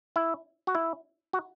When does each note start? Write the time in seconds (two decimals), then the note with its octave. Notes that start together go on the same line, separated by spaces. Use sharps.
0.16 E4
0.67 F#4
0.75 E4
1.33 F#4